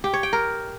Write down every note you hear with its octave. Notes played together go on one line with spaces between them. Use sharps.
G4
C#5
G5
A#4